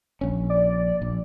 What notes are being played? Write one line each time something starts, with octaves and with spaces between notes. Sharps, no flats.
A#1 C#4
D5
A#1